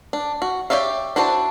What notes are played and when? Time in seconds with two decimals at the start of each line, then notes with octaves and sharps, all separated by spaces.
0.13 D4
0.42 F#4
0.70 G4 C#5 D5 E5 F5
1.16 D4 E4 F#4 C5 A5